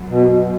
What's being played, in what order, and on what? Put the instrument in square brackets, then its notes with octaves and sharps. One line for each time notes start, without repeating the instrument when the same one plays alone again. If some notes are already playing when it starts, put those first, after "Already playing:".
Already playing: [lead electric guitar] F#2
[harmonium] B2